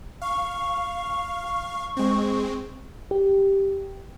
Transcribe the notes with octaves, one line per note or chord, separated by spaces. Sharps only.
F5 C#6
G#3 C4
G4